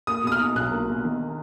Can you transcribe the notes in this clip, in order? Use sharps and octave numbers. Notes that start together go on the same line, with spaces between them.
A#3 D#6
B2 D#6
F6
D#4
B1 F#6
A#3
B2
D#3